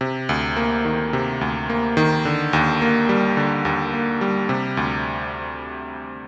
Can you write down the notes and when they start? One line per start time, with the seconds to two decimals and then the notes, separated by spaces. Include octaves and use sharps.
0.01 C3
0.29 D2
0.57 A#3
0.85 D#3
1.13 C3
1.41 D2
1.69 A#3
1.97 D#3
2.25 D3
2.53 D#2
2.82 A#3
3.09 G3
3.37 D3
3.65 D#2
3.94 A#3
4.21 G3
4.49 C3
4.77 D2